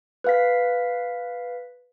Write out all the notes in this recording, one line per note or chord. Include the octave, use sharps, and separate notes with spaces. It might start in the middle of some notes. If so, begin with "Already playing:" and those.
B4 F5 B6